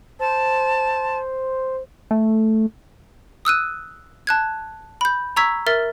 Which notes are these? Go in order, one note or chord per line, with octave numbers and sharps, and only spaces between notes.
C5 A5
A3
D#6 E6 F#6 D#7
A5 F#6 G#6
B5 G6
A#5 C#6 E6 G#6 B6
A#4 E5 F6 A6